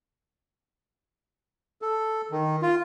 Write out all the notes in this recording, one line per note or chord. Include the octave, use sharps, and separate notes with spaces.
A4
D#3
F4